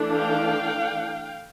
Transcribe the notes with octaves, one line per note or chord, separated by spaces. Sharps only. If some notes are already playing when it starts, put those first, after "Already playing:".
Already playing: E3 A3 D4
F5 G5